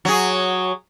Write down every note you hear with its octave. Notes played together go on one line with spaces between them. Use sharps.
F#3 G#4